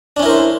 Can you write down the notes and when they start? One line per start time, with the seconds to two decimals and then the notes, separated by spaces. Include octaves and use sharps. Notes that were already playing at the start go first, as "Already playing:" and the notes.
0.17 D4
0.20 C#4
0.23 E4
0.26 A#4
0.29 C5